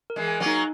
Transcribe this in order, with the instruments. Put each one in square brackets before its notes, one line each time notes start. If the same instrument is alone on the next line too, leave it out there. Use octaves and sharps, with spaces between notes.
[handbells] A#4
[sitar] E3 G#3
[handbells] G#5
[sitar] F#3 A#3
[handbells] D#4